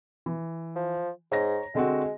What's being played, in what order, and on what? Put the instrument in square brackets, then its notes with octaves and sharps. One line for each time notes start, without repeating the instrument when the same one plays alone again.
[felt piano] E3
[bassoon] F3
[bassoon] G#2 [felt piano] C#5 A#5 A#6
[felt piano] D3 C4 F#4 [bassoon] G#3